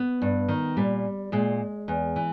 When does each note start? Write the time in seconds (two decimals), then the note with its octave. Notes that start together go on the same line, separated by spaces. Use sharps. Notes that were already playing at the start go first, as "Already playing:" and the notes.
Already playing: B3
0.22 G2
0.48 D#3
0.77 A#2 G3
1.32 A#2 G#3
1.88 E2
2.16 E3